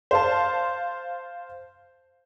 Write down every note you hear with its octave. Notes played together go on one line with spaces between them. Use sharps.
C5 F5 A5